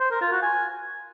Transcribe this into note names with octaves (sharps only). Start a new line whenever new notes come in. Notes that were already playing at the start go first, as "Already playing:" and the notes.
C5
A#4
F4
F#4
G#5